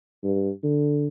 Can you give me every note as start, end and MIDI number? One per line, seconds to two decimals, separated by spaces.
0.24 0.50 43
0.64 1.07 50